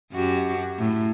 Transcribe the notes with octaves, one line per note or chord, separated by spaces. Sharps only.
F#2 F#4 G4
A2